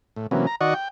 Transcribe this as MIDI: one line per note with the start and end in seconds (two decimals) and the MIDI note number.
0.16 0.27 45
0.31 0.46 48
0.31 0.46 52
0.31 0.46 54
0.31 0.46 58
0.31 0.46 59
0.31 0.46 61
0.47 0.56 82
0.61 0.74 51
0.61 0.74 66
0.61 0.74 74
0.61 0.74 75
0.61 0.74 78
0.61 0.74 85
0.74 0.88 79